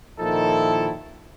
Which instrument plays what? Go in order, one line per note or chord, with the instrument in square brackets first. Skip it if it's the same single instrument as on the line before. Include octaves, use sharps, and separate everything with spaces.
[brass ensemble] A#2 D#3 F3 D#4 E4 A4